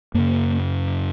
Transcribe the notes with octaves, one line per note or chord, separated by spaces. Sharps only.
F#2 C#3 A#3